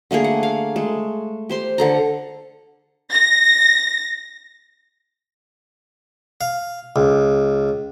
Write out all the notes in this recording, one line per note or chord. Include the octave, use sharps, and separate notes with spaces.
D3 A3 A#3 G#4
F#5
F5
G#3 A3
G4 C5 C6
D3 A4 A#5
A#6
F5
C#2